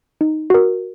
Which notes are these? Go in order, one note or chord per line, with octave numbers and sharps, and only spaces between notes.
D#4
F#4 A#4